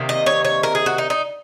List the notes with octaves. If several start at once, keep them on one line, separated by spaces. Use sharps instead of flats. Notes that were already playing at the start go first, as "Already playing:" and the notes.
Already playing: C3 D#3 A#3
D#5
C#5
C#5
A#4
G#4
F#4
D#4
D#4